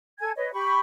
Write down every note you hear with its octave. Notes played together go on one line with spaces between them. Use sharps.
A4 G#5 G#6
B4 C#5 D#5
G4 B5 C#6